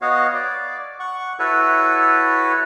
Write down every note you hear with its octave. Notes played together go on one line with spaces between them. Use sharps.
B3 F#4 C#5 D#5 F5
D5
F#5 C#6
E4 F#4 A4 B4 C#5